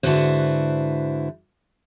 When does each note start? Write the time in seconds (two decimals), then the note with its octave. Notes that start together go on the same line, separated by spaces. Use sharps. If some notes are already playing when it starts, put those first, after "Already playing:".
0.03 G#2 D3 E4 F#4 B4 C5